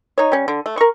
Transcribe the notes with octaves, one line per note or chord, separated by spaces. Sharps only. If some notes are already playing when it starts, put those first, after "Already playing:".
D#4 C#5
G3 C#4
D3
A3
A#4 C#6